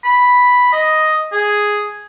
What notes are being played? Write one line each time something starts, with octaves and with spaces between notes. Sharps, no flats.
B5
D#5
G#4